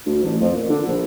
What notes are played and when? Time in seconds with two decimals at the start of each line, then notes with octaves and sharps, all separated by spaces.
0.06 D2
0.23 A1
0.41 F2
0.56 A#2
0.70 D3
0.87 A#1